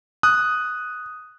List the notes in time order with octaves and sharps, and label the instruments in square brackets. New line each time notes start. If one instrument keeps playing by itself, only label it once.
[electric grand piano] D#6 F#6